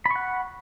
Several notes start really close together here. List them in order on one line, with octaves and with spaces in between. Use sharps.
B5 C#6 F#5